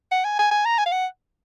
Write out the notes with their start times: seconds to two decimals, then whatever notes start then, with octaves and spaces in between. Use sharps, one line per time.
0.12 F#5
0.25 G#5
0.39 G#5
0.51 G#5
0.65 A#5
0.78 G#5
0.86 F5
0.92 F#5